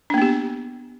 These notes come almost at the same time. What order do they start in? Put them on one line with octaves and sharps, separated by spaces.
D4 A#3 B3 G4